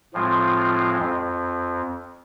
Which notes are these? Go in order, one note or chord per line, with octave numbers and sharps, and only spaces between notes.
A2 F3 G#3 C4 F4
F2